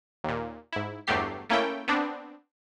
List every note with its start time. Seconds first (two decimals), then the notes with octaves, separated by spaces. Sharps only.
0.24 D#2 A#2
0.72 G#2 E4
1.07 G1 E2 F#3 A3 G4 C7
1.50 A3 A#3 C#4 E4 G5
1.88 B3 C4 D4